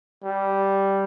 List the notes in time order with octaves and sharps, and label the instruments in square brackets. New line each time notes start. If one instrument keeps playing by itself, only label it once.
[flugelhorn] G3